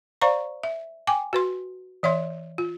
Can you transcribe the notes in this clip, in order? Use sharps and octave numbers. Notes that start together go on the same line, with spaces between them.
C5 D5 F5 A#5 C#6
E5
G5 G#5 D6
F#4 B4 C6
E3 C#5 E5 C6
F4